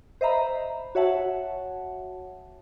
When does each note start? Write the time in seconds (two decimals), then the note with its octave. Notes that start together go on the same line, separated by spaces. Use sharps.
0.21 C5 D#5 E5 A#5 B5
0.95 F#4 C#5 E5 F#5 A5